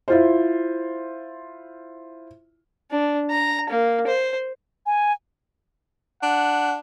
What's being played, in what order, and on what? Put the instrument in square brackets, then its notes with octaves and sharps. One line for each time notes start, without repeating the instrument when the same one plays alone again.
[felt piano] E4 F4 C5
[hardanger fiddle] D4
A#5
A#3
C5
[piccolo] G#5
[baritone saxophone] D4 [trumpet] F#5